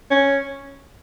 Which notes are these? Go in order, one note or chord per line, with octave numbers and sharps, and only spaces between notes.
C#4